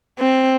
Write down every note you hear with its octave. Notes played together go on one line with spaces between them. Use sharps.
C4